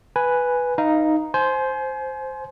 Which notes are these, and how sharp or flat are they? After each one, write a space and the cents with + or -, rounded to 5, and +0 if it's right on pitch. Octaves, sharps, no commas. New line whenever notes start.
B4 +0 G#5 +0
D#4 +0 F5 -20
C5 +0 G#5 +35 C6 +0